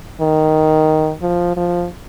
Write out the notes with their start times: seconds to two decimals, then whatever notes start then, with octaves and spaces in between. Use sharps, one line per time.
0.21 D#3
1.22 F3
1.56 F3